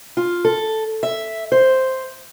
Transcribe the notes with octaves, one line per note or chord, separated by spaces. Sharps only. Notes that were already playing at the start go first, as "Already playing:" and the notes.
F4
A4
E5
C5